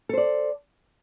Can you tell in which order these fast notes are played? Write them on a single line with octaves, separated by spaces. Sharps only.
A4 C5 D5